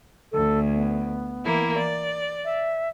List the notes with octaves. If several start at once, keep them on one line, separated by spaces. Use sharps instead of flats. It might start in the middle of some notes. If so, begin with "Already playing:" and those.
D2 A4
B3
E3 A#3 E4
D5
E5